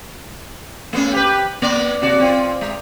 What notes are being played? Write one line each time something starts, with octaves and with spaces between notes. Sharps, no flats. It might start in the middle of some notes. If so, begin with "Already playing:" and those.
A3 B3 C#4
G4 B4
A#3 B3 D5
C3 F#4 D5
C4 F4
G#3